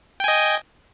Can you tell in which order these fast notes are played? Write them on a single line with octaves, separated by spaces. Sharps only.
G5 G#5 D#5